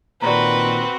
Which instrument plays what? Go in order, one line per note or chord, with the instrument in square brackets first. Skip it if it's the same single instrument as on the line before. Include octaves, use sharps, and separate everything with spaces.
[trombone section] A#2 D#3 [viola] C4 F#4 [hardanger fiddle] B4 [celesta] D5 A#5